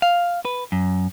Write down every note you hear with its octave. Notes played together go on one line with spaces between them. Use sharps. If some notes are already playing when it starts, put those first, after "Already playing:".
F5
B4
F#2